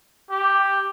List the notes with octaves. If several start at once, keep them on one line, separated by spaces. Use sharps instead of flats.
G4